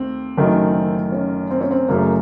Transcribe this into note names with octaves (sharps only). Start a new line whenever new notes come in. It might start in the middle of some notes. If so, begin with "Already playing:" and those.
Already playing: D#2 A3 C4
F#1 F#2 D#3 A3
C#4
C4
C#4
C4
F#1 F#2 C#3 A3 A#3